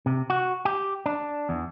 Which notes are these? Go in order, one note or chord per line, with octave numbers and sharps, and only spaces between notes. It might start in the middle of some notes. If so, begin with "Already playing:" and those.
C3
F#4
G4
D4
E2